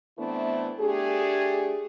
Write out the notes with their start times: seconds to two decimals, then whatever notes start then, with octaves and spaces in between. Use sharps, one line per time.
0.19 E3 A3 B3 C4 D4 E4
0.80 A3 D4 G4 G#4